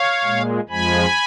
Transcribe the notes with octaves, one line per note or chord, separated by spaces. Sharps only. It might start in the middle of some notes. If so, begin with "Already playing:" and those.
Already playing: C#5 F5
A#2 G#3
F2 F3 G#3 G#5 B5